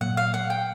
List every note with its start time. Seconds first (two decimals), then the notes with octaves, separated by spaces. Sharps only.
0.01 A#2 F#3 A#3 F#5
0.17 F5
0.34 F#5
0.50 G5